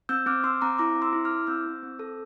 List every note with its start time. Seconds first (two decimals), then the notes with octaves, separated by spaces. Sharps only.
0.09 C4 E6 G6
0.26 C4 D6 F6
0.44 C4 C6 E6
0.61 C4 A#5 D6
0.78 E4 A#5 D6
0.96 C4
1.02 C6 E6
1.13 E4
1.25 D6 F6
1.31 E4
1.47 C4 E6 G6
1.66 C4
1.83 C4
1.99 A4